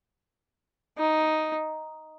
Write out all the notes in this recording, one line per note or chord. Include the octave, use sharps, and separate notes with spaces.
D#4